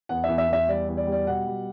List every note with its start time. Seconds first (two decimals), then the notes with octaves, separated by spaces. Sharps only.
0.09 E2 F#5
0.24 E2 E5
0.38 E5
0.48 E2 E5
0.68 G3 D5
0.88 E2
0.97 D5
1.07 G3
1.12 D5
1.27 B2 F#5
1.47 G3